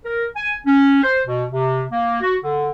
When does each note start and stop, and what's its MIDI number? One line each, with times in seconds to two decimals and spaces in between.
0.05 0.25 70
0.36 0.54 80
0.66 1.03 61
1.03 1.20 72
1.26 1.44 47
1.52 1.83 48
1.91 2.20 58
2.21 2.36 66
2.42 2.69 50